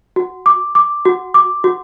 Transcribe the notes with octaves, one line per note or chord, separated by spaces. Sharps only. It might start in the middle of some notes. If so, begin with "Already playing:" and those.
F#4
D6
D6
F#4
D6
F#4